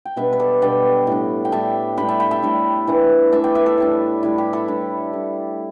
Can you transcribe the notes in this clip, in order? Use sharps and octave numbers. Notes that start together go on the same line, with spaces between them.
G5
B2 G3 B3 D4 B4 E5
B4
A4 D5
B2 G3 B3 D4 D5 G5
A2 G3 D4
G5
A2 G3 D4 E5 A5
A2 G3 D4 G5 B5
E5 A5
G5 B5
E5 A5
A2 G3 D4
E3 A3 D4
E3 A3 D4 E5 A5
D5 G5
B4 E5
A4 D5
A2 G3 D4
A2 G3 D4 E4
G4
E4 A4
A2 G3 D4
A2 G3 D4